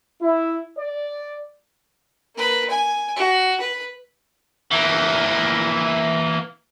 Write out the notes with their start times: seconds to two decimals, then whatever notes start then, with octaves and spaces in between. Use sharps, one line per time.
0.21 E4
0.77 D5
2.36 A#3 B4
2.70 G#5
3.16 F#4
3.60 B4
4.71 E3 A#3